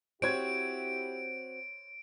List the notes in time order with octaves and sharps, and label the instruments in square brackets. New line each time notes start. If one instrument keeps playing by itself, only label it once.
[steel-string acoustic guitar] C4 F#4 [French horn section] E4 G4 [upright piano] C5 C#5 G#6 [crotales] D7